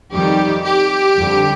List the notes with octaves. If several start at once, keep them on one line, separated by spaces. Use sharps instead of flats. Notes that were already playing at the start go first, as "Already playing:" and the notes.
F2 D#3 G3 G4
G4
F2 D3 G3